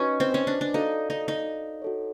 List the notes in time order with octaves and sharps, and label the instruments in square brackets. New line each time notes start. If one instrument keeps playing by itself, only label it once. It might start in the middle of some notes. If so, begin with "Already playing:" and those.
Already playing: [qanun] C#4 D#4 [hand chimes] F#4 B4 D#5 G#5
[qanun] C4
C#4
D4
D4
[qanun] D#4 [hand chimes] F#4 A4 D5 F5
[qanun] D#4
D#4
[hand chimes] F#4 A4 C#5